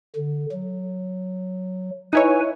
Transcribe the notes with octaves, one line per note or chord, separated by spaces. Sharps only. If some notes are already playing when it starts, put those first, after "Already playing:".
D3
F#3
D#4 E4 B4 C#5 G#5